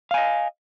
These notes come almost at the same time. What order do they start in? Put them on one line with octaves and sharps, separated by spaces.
F5 G#5 D#5